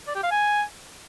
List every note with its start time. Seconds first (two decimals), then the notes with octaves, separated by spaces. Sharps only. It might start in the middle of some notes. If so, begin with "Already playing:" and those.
0.07 D5
0.15 G4
0.23 F5
0.31 G#5